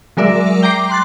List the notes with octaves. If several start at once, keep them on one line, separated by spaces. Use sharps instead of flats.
F#3 G#3 A#4 D5 E5
G5 A#5 D6 C7
C6 F#6 A6